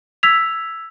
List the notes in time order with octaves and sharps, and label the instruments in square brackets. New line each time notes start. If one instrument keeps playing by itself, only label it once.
[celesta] E6 G#6 B6 F7